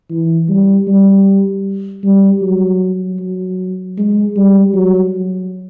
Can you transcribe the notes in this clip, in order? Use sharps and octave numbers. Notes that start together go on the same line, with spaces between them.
E3
G3
G3
G3
F#3
F#3
G#3
G3
F#3